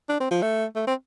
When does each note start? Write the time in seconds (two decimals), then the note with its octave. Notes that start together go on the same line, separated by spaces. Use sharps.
0.09 D4
0.20 C4
0.31 F3
0.42 A3
0.76 A3
0.87 C4